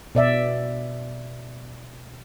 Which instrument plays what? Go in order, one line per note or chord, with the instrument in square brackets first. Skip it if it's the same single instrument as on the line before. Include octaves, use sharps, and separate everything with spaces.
[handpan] B2 D5 E5